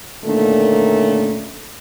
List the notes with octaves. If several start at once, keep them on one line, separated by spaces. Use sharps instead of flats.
A#2 D3 D#3 A3 A#3 C#4